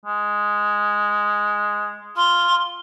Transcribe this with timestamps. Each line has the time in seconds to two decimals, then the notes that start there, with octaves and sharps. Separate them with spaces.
0.05 G#3
2.17 F4 C6